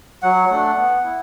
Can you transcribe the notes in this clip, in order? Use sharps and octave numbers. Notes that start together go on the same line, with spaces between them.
F#3 F#5
A3 D4
B3
E4